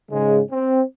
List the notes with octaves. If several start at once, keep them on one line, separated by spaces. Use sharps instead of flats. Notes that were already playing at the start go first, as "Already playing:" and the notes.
G#2 C#3 G#3
C4